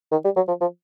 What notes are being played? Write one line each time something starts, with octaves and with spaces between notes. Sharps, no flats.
D#3
G3
F#3
F3
F3